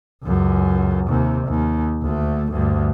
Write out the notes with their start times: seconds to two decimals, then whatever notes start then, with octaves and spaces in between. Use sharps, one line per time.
0.24 C#2 F#2
1.08 D#2 C3
1.48 D#2
2.02 D2 A3
2.52 D2 G2